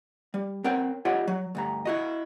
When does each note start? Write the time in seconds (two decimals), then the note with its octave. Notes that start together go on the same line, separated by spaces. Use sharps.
0.34 G3
0.64 C4 A#4 C#5 F#5 G5
1.05 F4 G4 C#5 D#5 E5 F#5
1.28 F#3
1.55 D2 G2 A#5
1.85 E4 F#4 D#5